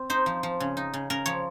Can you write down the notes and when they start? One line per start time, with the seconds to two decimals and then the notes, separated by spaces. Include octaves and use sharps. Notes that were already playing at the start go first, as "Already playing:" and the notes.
Already playing: C4
0.10 D#4 C5
0.26 F3
0.43 F3
0.60 C#3
0.77 D#4
0.94 C#3
1.10 C#3 A#4
1.26 F3 C#5